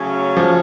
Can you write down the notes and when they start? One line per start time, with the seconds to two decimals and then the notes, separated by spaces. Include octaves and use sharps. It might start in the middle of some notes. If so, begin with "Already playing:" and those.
Already playing: C#3 F#3 A3 C#4
0.37 F3